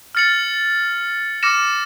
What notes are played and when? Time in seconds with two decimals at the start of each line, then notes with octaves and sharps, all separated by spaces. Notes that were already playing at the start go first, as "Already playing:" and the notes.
0.15 F6 A6 C#7 F#7
1.43 D6 F6 A#6 C#7 E7